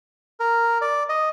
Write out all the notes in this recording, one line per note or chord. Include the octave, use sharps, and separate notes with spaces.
A#4
D5
D#5